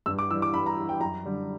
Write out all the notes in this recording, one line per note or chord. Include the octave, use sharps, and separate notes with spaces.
G2 E6
D6
E3 G3 E6
D6
G2 B5
A#5
E3 G3
G5
F#2 A#5
D3 G3